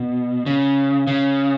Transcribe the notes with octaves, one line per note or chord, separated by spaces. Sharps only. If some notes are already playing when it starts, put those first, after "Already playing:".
Already playing: B2
C#3
C#3